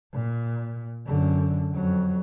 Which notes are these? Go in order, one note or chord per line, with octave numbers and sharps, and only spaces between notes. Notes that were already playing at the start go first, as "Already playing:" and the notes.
A#2
F#2 D3
F2 F#3